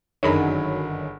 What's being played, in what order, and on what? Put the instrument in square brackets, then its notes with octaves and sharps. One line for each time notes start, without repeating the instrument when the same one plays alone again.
[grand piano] G1 G#4 B5 [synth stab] F#2 F#3 [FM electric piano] D#3 D4 D#4